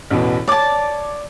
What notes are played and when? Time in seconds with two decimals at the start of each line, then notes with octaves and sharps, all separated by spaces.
0.10 A1 E2 B2
0.48 C#5 D5 A5 D6